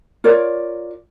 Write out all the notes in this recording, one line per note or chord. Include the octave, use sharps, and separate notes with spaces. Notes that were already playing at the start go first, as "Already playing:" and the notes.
F4 A#4 C#5 D5